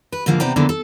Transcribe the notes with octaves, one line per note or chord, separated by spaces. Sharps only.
B4
G#2 D3 F3 A#3
C3 B3 C5 D5 G5 A#5
D3 E3 F3 A#3 B3 A4
A4